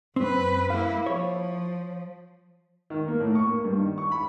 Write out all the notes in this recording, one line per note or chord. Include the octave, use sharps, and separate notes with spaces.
F#2 C4 B4
A#3 E4 F5
F3 C#5
D#3
A#3
A2
C#6
A#3
G2
D#3
C#6
B5